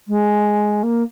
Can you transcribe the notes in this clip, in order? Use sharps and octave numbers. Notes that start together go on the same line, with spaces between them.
G#3
A#3